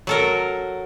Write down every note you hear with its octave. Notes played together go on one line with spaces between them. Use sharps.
F#3 A4 A#4